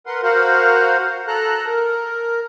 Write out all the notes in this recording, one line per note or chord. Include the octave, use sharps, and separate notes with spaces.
A#4 B4 F#5 C6
F#4 A#4 C5 F5 F#5
A4 A#5 F#6
A#4